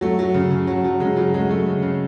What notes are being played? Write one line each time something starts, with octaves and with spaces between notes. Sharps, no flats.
F#3 A3
F#3
C#3
C#3
F#3
F#3
C#3 G#3
C#3 F#3
F#3 G#3
F#3 A3
C#3
C#3